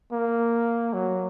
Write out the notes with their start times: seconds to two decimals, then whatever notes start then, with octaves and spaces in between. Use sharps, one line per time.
0.12 A#3
0.93 F#3